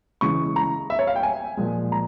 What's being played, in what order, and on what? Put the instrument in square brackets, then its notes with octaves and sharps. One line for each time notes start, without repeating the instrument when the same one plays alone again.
[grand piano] C#3 E3 G#3 C#6
A#5
E5
C#5
F5
G5
G#5
A#2 F3 G#3
A#5